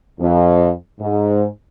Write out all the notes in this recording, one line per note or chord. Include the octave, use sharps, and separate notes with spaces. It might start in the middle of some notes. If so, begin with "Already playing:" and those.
F2
G#2